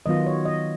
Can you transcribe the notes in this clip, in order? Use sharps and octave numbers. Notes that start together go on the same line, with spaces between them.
D#3 F#3 B3 F4 D#5
C#5
D#5